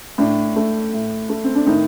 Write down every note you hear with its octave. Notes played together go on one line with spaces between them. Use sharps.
A2 D4
A3
A2
A3
C4
D4
A2 D#3 D#4